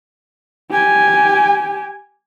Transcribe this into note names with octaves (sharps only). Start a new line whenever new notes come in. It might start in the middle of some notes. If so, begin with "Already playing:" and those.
G4 G#5